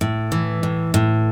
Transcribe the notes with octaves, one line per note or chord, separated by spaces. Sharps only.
A2
E3
A2
A2